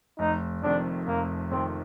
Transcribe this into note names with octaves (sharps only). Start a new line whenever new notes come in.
F1 D#4
F2 C3 D#3 D4
F1 A#3
F2 C3 D#3 C4